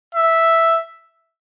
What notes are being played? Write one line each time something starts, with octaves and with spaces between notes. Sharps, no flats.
E5